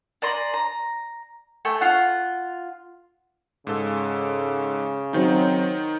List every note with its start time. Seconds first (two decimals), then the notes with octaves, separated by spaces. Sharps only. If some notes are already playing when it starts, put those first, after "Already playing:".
0.22 D5 G#5 A#5 C6
0.54 A#5
1.65 A3 G5 G#5
1.81 F4 F#5
3.67 G#2 C#3 A4
5.13 D#3 F#3 C4 D#4